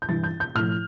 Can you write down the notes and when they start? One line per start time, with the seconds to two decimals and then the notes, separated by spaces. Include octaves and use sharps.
0.02 G6
0.08 G2 E3 G3 A6
0.24 G6
0.40 G6
0.55 A2 F6
0.60 F3